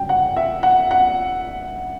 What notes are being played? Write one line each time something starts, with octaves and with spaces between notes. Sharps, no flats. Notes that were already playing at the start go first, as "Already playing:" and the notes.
Already playing: G1 F#2 C#3 G5
F#5
E5
F#5
F#5